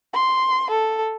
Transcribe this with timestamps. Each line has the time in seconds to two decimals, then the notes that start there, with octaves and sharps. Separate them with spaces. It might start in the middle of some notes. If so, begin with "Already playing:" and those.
0.13 C6
0.70 A4